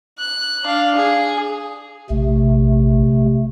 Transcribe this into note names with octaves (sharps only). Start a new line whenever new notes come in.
F#6
D4 F5
G#4
A#1 C3 A3